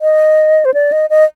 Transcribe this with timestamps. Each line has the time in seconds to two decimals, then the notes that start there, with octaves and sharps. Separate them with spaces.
0.01 D#5
0.65 C5
0.74 D5
0.92 D#5
1.10 D#5